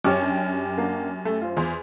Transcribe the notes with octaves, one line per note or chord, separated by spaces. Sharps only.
F#2 G4 C#5 C#6 D6 F6
D4
A#3 D4 F#4
A3
F4 C5
E2 C6